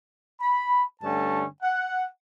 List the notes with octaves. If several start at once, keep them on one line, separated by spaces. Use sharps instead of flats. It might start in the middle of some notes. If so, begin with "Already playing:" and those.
B5
G2 D3 A3 C#4 A5
F#5